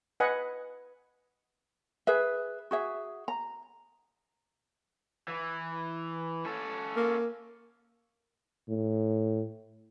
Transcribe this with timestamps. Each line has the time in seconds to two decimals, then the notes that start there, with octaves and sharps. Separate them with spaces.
0.20 B4 D#5 F#5 G#5 B5
2.07 G#4 B4 E5
2.71 F#4 G#4 E5
3.28 A#5
5.28 E3
6.45 C#4 A4
6.96 A#3
8.69 A2